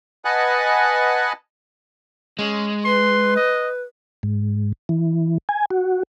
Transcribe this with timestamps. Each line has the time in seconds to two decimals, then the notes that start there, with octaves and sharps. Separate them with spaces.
0.25 B4 D#5 F#5 G#5 A5 F#6
2.39 G#3 C#4
2.85 B4 C6
3.36 D#5
4.23 G#2
4.89 E3
5.49 G#5
5.71 F#4